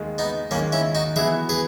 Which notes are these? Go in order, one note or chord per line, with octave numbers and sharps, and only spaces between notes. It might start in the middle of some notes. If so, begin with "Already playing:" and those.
Already playing: D#2 D#3 G#3
B3 D#4
D#2 D#3 G#3 A#3 C#4
C#4 E4
D#4 F#4
E3 B3 E4 F#4 G#4
G#4 B4